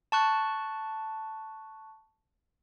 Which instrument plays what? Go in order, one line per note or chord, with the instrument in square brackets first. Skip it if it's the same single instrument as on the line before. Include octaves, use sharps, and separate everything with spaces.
[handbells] A5 C#6 F#6